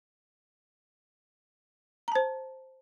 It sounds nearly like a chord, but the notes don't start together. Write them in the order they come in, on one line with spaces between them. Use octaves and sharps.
A#5 A5 C5